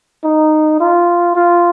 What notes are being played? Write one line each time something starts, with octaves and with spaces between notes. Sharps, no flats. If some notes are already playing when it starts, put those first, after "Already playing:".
D#4
F4
F4